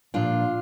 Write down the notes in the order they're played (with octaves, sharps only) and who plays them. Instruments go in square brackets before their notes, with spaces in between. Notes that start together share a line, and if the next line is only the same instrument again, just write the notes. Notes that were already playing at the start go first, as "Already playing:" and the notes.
[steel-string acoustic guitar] A#2 F3 D4 F4